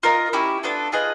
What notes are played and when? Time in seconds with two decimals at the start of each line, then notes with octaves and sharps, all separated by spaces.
0.03 F4 A#4 D#5
0.33 C#4 E4 G4
0.63 B3 D4 F4 A4
0.92 F4 G#4 B4 D#5